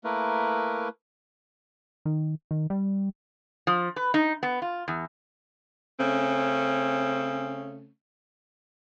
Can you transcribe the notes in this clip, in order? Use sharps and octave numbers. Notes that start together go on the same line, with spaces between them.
A3 A#3 E4 A#4 B4
D#3
D#3
G3
F3
B4
D#4
B3
F4
E2
C#3 A3 C4 C#4